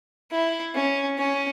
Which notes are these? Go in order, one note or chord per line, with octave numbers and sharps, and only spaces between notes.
E4
C#4
C#4